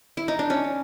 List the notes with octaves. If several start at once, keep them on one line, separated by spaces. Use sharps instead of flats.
E4
D#4
D4
C#4